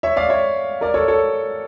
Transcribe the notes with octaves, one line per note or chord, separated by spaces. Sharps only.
C#5 E5
D5 F5
C#5 E5
A#4 D5
A4 C#5
A4 C#5